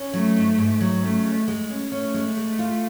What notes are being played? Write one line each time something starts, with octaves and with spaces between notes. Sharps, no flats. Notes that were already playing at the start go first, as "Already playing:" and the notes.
Already playing: C#4
F#3 A3
G#2
G#2
F#3
A3 C#4
G#3
G#3
C#4
A3 C#4
G#3
G#3
F4